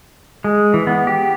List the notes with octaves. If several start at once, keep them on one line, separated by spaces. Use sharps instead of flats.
G#3
E3
B3
G4